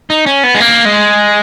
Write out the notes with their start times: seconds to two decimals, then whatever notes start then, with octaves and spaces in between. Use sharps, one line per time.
0.10 D#4
0.26 C#4
0.44 B3
0.55 G#3
0.60 A#3
0.85 G#3